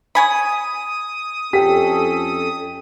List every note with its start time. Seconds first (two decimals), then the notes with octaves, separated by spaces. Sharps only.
0.15 C#5 G#5 B5 D#6
1.53 F2 C#4 G4 A4 B6